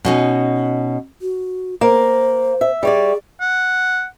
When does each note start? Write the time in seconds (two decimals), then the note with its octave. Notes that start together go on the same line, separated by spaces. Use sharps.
0.05 B2 C#4 D#4
1.21 F#4
1.81 A#3 C5
2.61 E5
2.83 G3 G#4 C#5 D5
3.41 F#5